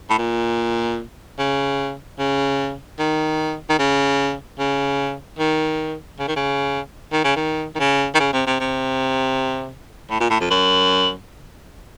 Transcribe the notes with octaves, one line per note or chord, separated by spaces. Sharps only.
A2
A#2
C#3
C#3
D#3
D#3
C#3
C#3
D#3
C#3
D#3
C#3
D#3
C#3
D#3
D#3
C#3
D#3
C#3
C3
C3
C3
A2
A#2
A2
F2
F#2